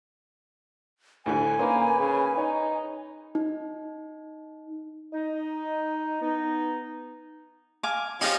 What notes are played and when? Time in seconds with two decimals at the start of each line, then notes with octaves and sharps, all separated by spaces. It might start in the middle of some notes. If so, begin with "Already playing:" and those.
1.26 D2 A2 D3 G#5
1.59 A#3 C#4 D#4 B4 C5
1.98 C#3
2.37 D#4 C#5
3.35 D#4
5.13 D#4
6.21 B3 D#4
7.83 F5 G#5 D6
8.21 F3 C#4 D#4 G4 F5